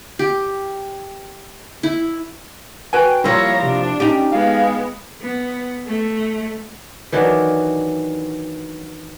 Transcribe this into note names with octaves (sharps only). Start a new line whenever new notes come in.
G4
E4
F#4 B4 G5 G#5
F3 G3 A#3 E4 C#5 A#5
C3 D4
C#4 D#4 G4
G#3 B3 F5
B3
A3
D#3 E3 F#3 D4